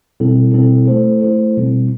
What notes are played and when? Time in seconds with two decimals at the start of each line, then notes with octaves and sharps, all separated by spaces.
0.20 B2 G3 C4 E4 A4
0.54 B2 G3 C4 E4 A4
0.88 A3 E4 A4 C5
1.22 A3 E4 A4 C5
1.57 B2 G3 C4 E4